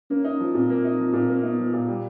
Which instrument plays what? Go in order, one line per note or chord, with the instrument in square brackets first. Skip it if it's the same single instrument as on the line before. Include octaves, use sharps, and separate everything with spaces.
[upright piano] A#3 [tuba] C#4
[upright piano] D#4
F3
[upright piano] A#2 [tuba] C4
[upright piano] A#3
D#4
F3
A#2
A#3
[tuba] B3 [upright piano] D#4
[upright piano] F3
A#2
G3